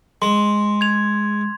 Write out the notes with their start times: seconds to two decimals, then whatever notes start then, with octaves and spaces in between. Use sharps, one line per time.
0.22 G#3 C6
0.81 G#6 F7